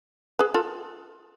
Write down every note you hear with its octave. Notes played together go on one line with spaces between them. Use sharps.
G#4 B4
F4 A4